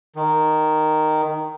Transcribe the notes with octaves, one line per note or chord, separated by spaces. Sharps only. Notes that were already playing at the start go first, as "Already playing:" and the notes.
D#3